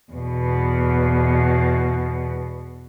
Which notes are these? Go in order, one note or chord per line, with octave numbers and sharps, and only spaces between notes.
E2 B2